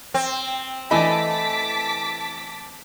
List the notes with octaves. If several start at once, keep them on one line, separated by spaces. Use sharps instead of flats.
C4
E3 A3 D#5 G#5 A5 B5 D6 B6